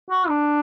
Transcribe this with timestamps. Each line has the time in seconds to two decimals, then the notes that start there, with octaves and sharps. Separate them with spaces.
0.10 F#4
0.29 D4